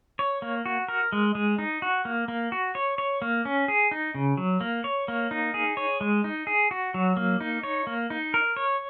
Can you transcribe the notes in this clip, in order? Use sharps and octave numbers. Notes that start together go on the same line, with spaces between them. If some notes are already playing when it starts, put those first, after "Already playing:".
C#5
A#3
F#4
A#4
G#3
G#3
D#4
F#4
A#3
A#3
F#4
C#5
C#5
A#3
C#4
G#4
D#4
C#3
F#3
A#3
C#5
A#3
D#4
G#4
C#5
G#3
D#4
G#4
F#4
F#3
A#3
D#4
C#5
A#3
D#4
A#4
C#5